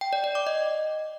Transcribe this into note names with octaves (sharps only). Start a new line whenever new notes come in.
G5
D5
D5
D6
D#5